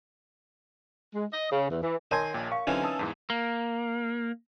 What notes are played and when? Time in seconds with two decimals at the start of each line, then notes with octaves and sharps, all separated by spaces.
1.14 G#3
1.32 D#5
1.52 C#3
1.70 E2
1.82 E3
2.11 D#3 A#4 C#5 D#5 G#5 A5 C6
2.34 A#1 A#2 G5
2.52 F5 C#6
2.67 D3 E3 F#3 C4 C#4 D#4
2.84 A5 D#6 E6
2.99 E2 G#2 E3
3.30 A#3